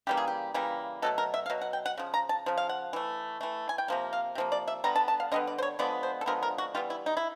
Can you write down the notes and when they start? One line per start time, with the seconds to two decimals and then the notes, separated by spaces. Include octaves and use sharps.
0.07 C#3 E3 G3 A#3 G4
0.17 G#4
0.27 G4
0.54 C#3 E3 G3 A#3
1.02 B2 F#3 A3 A4
1.18 A#4
1.34 E5
1.46 F5
1.50 B2 F#3
1.61 F#5
1.73 G5
1.86 F#5
1.98 C#3 F3
2.14 A#5
2.29 A5
2.46 C#3 F3
2.57 F5
2.69 F#5
2.93 E3 A3
3.41 E3 A3
3.69 G#5
3.78 G5
3.88 C3 F3 A#3
4.13 F5
4.35 C3 F3 A#3
4.52 D5
4.68 E5
4.84 D3 G3 B3 A#5
4.95 A5
5.08 A5
5.20 F5
5.32 D3 G3 B3 D#5
5.47 D5
5.58 C5
5.62 C#5
5.79 D3 F3 G#3 B3 D5
6.03 C5
6.21 A4
6.26 D3 F3 G#3 B3 A#4
6.42 A#4
6.58 F#4
6.75 E3 G3 B3 F4
6.90 E4
7.06 D#4
7.17 E4